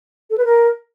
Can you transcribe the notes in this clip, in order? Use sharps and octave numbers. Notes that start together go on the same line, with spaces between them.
A4
B4
A#4